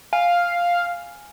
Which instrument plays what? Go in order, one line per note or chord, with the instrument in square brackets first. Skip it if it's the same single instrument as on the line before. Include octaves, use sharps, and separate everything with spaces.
[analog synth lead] F5 [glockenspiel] G#5